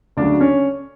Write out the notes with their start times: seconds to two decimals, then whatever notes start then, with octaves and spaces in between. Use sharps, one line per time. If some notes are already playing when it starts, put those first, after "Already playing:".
0.17 D2 C#3 F#3 D4 D5
0.40 C#4 C#5